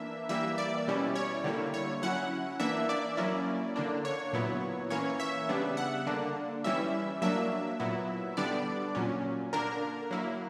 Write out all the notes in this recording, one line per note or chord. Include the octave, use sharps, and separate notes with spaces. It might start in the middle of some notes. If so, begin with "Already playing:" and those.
Already playing: E3 A#3 D4 E5
E3 G3 A#3 E5
D5
B2 G3 C#4 E4
C#5
D3 G3 A#3 E4
C#5
F#3 C#4 E4 F#5
E3 A#3 D4 E5
D5
F#3 A#3 C#4 E4
D3 A#3 D4
C#5
A#2 F#3 B3 E4
E3 A#3 C#4 C#5
E5
C#3 G3 B3 D4
F#5
D3 A#3 D4
E3 G3 C#4 E4 E5
F#3 A#3 D4 E5
A#2 F#3 B3 E4
D3 G3 B3 D4 D5
A#2 F#3 C#4
D3 A#3 D4 A#4
F#3 A#3 E4